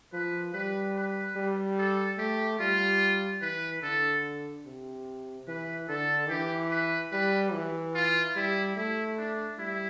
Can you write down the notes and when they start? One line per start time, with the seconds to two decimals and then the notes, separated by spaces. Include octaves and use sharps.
0.13 F3 B4
0.54 G3 B4
0.96 B4
1.36 G3
1.78 A4
2.18 A3 G4
2.59 G3 F4
3.41 E3 B4
3.82 D3 A4
4.66 C3
5.48 E3 B4
5.88 D3 A4
6.29 E3 G4
6.70 B4
7.12 G3 B4
7.53 E3
7.94 F4
8.35 G3 E4
8.76 A3 E4
9.18 D4
9.59 G3 E4